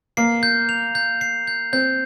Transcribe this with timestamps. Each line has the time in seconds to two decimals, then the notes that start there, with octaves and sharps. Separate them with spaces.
0.17 A#3 C7
0.43 G6
0.69 F7
0.95 G6
1.21 C7
1.47 G6
1.73 C4 G6